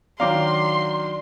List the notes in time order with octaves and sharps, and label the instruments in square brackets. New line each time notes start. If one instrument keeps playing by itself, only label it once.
[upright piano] D#3 F#3 D4 [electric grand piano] F5 A#5 D6 [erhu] C6